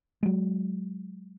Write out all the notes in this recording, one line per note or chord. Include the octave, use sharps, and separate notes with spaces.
F#3 G#3